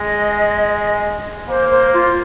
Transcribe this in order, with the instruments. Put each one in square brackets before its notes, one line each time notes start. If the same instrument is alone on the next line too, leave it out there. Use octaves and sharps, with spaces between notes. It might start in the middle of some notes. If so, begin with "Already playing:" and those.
Already playing: [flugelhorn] G#3 [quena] D#5
[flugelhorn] A#3 [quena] C5
[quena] C5
F4